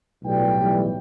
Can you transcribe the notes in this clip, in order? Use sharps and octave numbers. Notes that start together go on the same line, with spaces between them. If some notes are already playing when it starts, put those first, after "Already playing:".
B1 A2 G3 G5
B1 A2 E3 G3